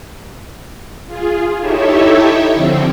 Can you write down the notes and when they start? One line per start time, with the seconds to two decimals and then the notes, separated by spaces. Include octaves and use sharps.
1.07 F4 G#4
1.60 D#4 E4 G4 A4 C#5 E5
2.54 D3 F3 C4